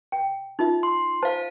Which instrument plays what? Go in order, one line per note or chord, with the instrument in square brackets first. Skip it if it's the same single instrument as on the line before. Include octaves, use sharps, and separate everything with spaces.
[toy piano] G5
D#4 F4 E5
[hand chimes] C6
[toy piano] C5 [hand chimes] F5 A5